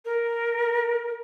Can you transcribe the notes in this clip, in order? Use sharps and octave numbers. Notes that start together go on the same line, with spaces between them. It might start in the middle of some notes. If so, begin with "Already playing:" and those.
A#4